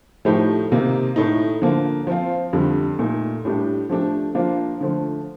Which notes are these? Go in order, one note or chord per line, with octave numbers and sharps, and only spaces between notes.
A2 F3 A3 D#4 G4
C3 D#3 A#3 D#4
A2 A3 D#4
D3 F3 A#3
F3 C4 F4
F2 D3 G3
A#2 A3 D#4
A2 G3 D4 G4
F3 A3 D4 G4
F3 A#3 D4 F4
D3 F3 A3